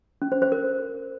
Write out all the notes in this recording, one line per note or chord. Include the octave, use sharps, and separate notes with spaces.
C#4
C5
C5
A#4